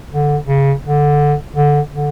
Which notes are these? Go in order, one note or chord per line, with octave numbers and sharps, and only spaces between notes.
D3
C#3
D3
D3
D3